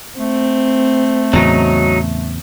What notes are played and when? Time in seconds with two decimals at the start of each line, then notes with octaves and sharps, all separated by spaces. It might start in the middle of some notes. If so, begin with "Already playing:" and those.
0.19 A3 C4
1.33 E2 A2 C#3 F#3 D#4